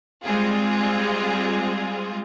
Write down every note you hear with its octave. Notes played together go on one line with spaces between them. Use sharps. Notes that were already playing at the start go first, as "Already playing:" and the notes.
G3 G#3 C4 F4 G#4